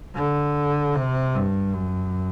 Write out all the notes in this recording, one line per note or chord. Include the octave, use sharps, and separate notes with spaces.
D3
C3
G2
F#2